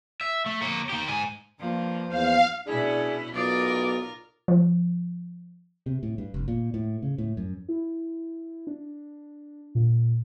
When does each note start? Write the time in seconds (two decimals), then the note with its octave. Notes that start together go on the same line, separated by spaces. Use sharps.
0.21 E5
0.46 A3
0.62 A#3 C#5
0.89 D#3 G4
1.09 G#2 G#5
1.59 G2 F3 A#3
2.08 E2 C5 F5
2.67 B2 C#4 D4 E4 G#4 D5
3.34 B1 F4 A#4 D5 D#6
4.48 F3
5.86 C3
6.03 A2
6.18 G2
6.34 F1
6.48 A#2
6.74 A2
7.03 C#3
7.18 A2
7.37 F#2
7.69 E4
8.67 D4
9.75 A#2